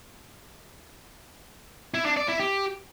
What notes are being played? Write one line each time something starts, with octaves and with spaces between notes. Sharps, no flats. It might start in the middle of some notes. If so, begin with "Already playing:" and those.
E4
D4
D5
E4
G4